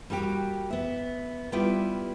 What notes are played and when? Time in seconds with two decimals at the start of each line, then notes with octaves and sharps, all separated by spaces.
0.10 G3 A#3 F#4 G4
0.70 B3 E5
1.52 G3 B3 E4 F4 G4 B4